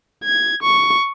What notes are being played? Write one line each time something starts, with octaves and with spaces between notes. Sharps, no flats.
G#6
C#6